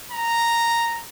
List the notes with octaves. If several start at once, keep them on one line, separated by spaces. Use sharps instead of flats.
A#5